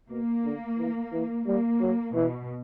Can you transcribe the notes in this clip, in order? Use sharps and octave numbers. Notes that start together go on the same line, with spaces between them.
B2 A#3
D3
E3
E3
G3 A#3
F#3
B2 E3